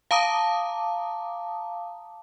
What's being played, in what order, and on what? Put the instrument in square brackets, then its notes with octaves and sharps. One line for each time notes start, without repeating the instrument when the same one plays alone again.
[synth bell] F5 A5 A#5 D6 D#6